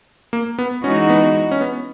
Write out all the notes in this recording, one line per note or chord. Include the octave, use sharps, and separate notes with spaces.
A#3
B3
E3 G#3 C#4 D#4 F#4
B3
C#4
B3